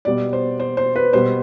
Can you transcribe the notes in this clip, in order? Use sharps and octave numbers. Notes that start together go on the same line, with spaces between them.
B2 G3 B3 D5
C5
C5
C5
B4
B2 G3 B3 C5